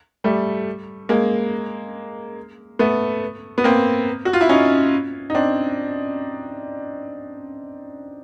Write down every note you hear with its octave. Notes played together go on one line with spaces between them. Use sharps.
G3 A3
G#3 A#3
A3 B3
B3
A#3 C4
F#4
F4
E4
C#4 D#4
D#4
C4 D4